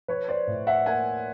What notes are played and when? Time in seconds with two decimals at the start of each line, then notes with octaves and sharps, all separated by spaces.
0.08 F3 B4 C#5
0.28 C5 D5
0.47 A2
0.67 E5 F#5
0.86 A#3 F#5 G#5